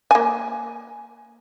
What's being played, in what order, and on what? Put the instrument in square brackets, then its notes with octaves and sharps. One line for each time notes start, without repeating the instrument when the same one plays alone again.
[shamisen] A#3 G#5